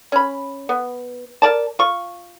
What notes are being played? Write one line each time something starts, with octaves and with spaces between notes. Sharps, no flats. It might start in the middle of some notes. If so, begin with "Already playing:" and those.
C#4 B5
B3
A#4 D5 A5
F4 C#6